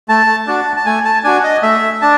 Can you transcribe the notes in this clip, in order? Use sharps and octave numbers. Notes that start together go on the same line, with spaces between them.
A3 A5
D4 F#4 A5
A5
A3 G#5
A5
D4 F#4 G#5
D#5
A3 E5
D4 A5